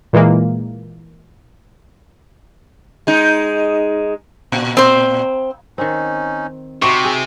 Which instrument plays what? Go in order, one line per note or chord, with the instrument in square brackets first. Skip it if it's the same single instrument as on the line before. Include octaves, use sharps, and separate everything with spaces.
[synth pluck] A#2 E3 G#3 A#3
[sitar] G#3 D#4
A#2
[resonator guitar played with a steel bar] C4 C5
[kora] D#3 C4 [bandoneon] C#4 D#4
[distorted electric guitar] C3 [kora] D#4 F#4 E5 [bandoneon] G4 [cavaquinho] C5 C#6 D6
[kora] G#4